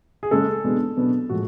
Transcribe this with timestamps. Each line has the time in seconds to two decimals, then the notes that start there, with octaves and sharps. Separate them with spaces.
0.23 G#4
0.31 C#3 G#3 C#4 A4
0.64 B2 G#3 B3 D4
0.97 B2 F#3 B3 D4
1.30 A2 F3 G#3 F#4